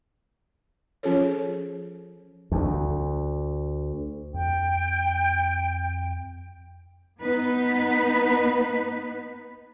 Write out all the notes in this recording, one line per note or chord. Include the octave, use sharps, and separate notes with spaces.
F3 C#4 F4 G#4 A4 C#5
D2
F2 G5
B3 D#4 B4